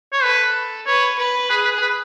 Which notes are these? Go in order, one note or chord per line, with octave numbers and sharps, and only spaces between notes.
C#5
A4 B4
B4 C#5
B4
G#4 B4
B4
B4